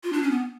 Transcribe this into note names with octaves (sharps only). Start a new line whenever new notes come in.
F4
D4
C#4
B3